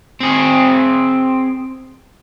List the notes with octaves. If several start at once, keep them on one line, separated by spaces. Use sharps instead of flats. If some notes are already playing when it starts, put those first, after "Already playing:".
C4 G#4